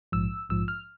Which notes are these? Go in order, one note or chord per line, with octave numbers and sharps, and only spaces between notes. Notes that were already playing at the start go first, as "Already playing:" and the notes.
A#1 G#2 F3 E6
A#1 G#2 F3 E6
F6